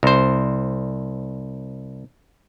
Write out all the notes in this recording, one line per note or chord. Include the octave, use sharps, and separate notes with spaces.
C2 C5